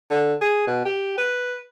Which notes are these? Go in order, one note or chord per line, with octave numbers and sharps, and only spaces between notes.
D3
G#4
B2
G4
B4